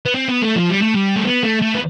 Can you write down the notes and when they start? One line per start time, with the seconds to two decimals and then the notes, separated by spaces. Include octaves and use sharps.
0.06 B3
0.14 C4
0.28 B3
0.42 A3
0.56 F3
0.70 G3
0.82 A3
0.94 G3
1.16 A3
1.25 B3
1.43 A3
1.62 A3
1.75 B3